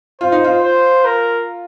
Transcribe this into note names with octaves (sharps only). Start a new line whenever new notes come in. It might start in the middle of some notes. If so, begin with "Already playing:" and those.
F4 C5
D#4
F4
C5
A#4